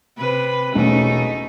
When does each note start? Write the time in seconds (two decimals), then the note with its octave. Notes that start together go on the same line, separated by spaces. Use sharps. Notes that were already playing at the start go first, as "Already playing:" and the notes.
0.18 C3 B4
0.75 E1 A3 C#4 D#4